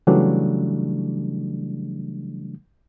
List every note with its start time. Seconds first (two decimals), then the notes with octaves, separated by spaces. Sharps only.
0.07 C#3 E3 F#3 G3 A3 D4